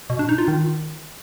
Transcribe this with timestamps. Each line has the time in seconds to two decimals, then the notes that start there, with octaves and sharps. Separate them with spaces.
0.10 B2
0.19 D4
0.29 D#4
0.38 F4
0.48 D#3